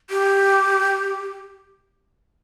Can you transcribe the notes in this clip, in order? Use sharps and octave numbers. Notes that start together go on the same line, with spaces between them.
G4